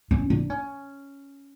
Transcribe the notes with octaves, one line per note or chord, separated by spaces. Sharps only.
C#4
D4
C#4